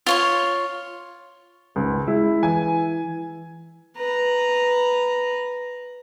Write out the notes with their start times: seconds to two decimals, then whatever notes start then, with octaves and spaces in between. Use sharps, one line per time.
0.06 F4 C#5 C6
1.76 G#1 C#2
2.08 G#3 E4
2.43 E3 G#5
3.97 B4 A#5